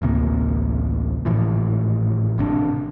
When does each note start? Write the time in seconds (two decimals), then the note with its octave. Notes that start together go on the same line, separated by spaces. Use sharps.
0.02 A1 D2 C3 A#3
1.25 G#1 A2 E3 F3
2.38 G#1 C3 C4 D4